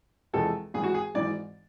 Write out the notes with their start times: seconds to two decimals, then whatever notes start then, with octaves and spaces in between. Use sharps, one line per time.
0.33 E2 C3 F3 G#3 A4
0.74 G#1 G#2 E3 G#3 G#4
0.84 F#4
0.94 G#4
1.14 G#1 G#2 E3 G#3 D5